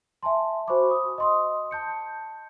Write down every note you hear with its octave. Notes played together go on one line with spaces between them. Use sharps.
E5 G#5 A5 C6
F#4 C5 G#5 B5 C#6 D6
D#6
D#5 C6 D#6
A5 G6 C#7